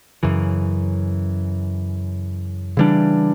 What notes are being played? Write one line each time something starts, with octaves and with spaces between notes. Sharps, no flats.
F#2 C#3 E3
C#3 E3 G3 D4